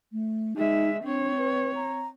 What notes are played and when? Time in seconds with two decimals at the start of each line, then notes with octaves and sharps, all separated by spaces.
0.12 A3
0.56 G#3 D#4 E5
1.04 C4 D4 C#5
1.38 B4
1.75 A#5